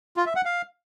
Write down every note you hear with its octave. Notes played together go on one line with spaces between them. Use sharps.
F4
E5
F#5
F5